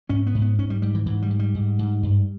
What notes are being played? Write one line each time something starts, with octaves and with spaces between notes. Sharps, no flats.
G#2 C#4
B3
G#2
B3
G#2 C#4
G3
G#2 G3
E3
G#2 E3
G3
G#2
G3
G#2
G#2
G2